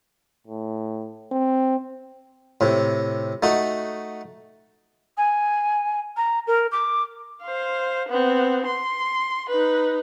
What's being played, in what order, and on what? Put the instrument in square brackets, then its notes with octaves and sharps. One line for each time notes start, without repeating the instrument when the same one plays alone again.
[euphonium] A2
C4
[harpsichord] A2 C3
A3 D#4 F#4
[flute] G#5
A#5
A#4
D6
[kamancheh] C5 F5
B3 C4
C6
D#4 B4